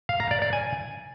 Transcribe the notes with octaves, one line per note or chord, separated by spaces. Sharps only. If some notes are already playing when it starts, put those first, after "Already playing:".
F5
A#5
D5
D5
G#5